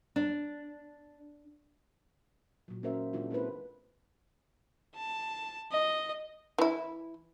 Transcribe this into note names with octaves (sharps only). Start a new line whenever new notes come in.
D4
A#2 F#3
A#3 C#4 F#4 A#4 C5 E5
A#2 E3 G#3 D4 F4 F#4
A#3 C4 E4 A4 B4 C5
A5
D#5
E3 E4